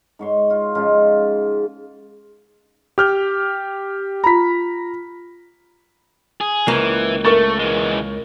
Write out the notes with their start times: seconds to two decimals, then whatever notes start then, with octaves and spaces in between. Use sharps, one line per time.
0.19 G#2 C#5 C6
0.50 F4
0.75 G#2 C#3 F3 F4
2.98 G4 F6 G6
4.24 F4 A#5 B5 B6
6.41 G#4
6.68 C#2 E3 A#3
7.25 A3 A#4 C#6 A6
7.59 E3 G#3